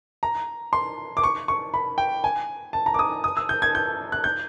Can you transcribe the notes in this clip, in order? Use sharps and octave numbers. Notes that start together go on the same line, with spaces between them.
A#5
C6
D6
C#6
C#6
B5
G5
G#5
A5
A#5
D6
D#6
D#6
E6
G6
G#6
G6
F#6
G6